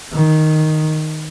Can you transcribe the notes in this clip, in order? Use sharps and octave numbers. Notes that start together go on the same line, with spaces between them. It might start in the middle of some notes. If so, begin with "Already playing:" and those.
D#3